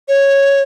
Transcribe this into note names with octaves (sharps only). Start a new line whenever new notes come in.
C#5